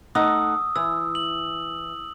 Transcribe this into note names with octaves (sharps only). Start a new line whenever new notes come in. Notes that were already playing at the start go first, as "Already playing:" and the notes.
A3 D#4 F#5 D#6 E6
E3 E6
F#7